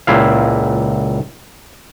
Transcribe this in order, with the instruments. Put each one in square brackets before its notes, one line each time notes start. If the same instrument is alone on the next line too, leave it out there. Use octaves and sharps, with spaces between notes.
[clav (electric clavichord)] C#2 A#2 E4 F5